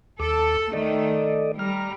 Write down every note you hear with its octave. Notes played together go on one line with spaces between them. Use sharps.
D#2 A4 D6
D#3 A3 A4 D5 D#5
G3 A#5 F6